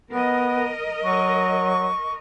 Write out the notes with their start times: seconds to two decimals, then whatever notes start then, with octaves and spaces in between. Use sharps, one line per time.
0.11 B3 A#4 D#5
1.04 F#3 C#6